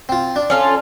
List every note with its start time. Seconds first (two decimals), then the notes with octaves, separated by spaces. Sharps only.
0.09 C4 F4
0.36 D4
0.50 C#4 F4 A4